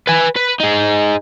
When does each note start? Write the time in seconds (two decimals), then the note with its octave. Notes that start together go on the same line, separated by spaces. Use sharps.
0.07 B4 G#5
0.36 B4
0.60 D#4 G#4